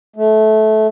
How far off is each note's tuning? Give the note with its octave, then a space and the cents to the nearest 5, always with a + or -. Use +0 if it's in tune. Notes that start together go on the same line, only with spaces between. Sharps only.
A3 -20